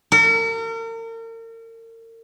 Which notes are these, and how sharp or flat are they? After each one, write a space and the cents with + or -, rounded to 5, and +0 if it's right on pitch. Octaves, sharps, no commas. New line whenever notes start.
A#4 -40